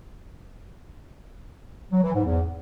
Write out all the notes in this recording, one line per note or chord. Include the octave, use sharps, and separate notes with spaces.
F#3
E3
G#2
E2